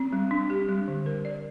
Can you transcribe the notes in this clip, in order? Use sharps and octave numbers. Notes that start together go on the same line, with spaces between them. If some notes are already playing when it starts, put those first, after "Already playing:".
Already playing: C4
G3
D4
G4
G3
D3
A#4
D5